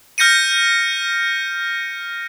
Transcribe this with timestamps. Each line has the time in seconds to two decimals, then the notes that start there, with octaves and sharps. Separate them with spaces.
0.18 F6 G6 A#6 C#7 D#7